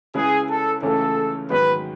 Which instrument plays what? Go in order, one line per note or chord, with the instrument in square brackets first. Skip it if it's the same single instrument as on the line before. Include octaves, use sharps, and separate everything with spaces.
[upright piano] C#3 G#3 C#4 E4 B4 [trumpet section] G#4
[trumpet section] A4
[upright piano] C#2 C#3 E3 A3 C#4 [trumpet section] A4
[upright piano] G#2 D#3 F#3 B3 [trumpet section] B4